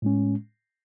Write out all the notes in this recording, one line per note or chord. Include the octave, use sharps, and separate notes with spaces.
A2 G#3 C#4